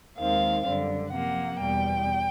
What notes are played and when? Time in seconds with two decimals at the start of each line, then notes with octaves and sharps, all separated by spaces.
0.18 D#2 D#3 G#3 C4 F5
0.66 F#2 D3 G3
1.12 C3 F3 A#3 F#5
1.59 E2 B2 G3 G5